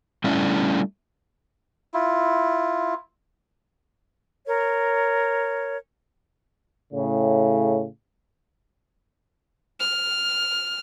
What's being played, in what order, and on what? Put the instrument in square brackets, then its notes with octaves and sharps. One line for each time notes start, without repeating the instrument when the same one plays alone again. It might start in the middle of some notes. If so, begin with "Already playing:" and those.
[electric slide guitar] G3 A3 C#4 D4 E4
[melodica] E4 F4
[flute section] A#4 C#5
[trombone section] A2 C#3
[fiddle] F6